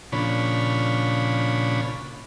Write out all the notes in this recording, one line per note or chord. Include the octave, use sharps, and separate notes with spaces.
A#2 C#3 F3 D4 C#5 B5